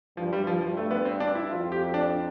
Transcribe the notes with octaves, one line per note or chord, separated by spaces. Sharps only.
G2 F3
G3
F3
G2 F3
A3
B3
C4
D4
E4
F2 F4
G4
D4